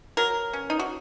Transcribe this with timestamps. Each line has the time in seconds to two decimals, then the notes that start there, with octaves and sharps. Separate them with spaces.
0.17 F#3 A#4
0.53 C#4
0.70 D#4
0.79 F#4